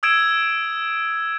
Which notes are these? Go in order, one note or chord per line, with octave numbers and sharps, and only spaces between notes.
D#6 E6 G#6 D7 E7